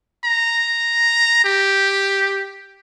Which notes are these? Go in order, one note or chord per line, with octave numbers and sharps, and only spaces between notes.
A#5
G4